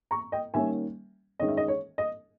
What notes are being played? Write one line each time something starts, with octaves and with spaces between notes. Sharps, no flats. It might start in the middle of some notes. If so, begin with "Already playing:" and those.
A#5 C#6
D#5 G5
D#3 G3 A#3 C#4 E5 G#5
D#3 G#3 C#4 D#5
E5
D#5
C#5
D#5